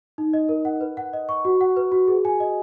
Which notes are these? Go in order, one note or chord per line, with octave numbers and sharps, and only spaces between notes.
D#4
D#5
A#4
F#5
B4
F#5
D#5
C#6
F#4
F#5
B4
F#4
G#4
G#5
D#5